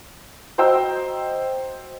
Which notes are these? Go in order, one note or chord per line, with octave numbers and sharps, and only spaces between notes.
F#4 C5 D#5 G5 A#5 E6